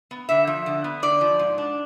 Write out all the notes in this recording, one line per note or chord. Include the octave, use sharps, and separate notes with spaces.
B3
D3 E5
F3
D3
B3
D3 D5
F3
G#2
D4